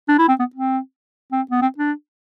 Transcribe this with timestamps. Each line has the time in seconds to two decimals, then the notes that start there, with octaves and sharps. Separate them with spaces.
0.09 D4
0.18 E4
0.29 C4
0.39 B3
0.55 C4
1.32 C4
1.51 B3
1.62 C4
1.78 D4